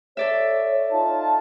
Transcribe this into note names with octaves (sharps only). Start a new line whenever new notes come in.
A4 C#5 D5 E5
D#4 F4 A5